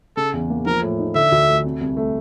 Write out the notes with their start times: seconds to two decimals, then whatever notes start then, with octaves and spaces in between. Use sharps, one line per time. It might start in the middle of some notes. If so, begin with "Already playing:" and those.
0.17 C#3 A4
0.33 E2
0.50 A#3
0.66 F3 A#4
0.82 A2
0.99 D#4
1.15 D3 E5
1.32 D2
1.48 A3
1.65 C3
1.81 C2
1.97 A3